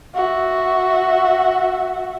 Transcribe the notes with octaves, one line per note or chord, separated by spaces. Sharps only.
F#4 E5